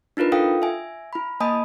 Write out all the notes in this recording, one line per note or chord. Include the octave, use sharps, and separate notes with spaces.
D4 D#4 F4 A#4 B4
F4 A4 F5 G5 D#6
E5 G#5
E4 B5
A#3 D#5 G#5 A5 B5 D#6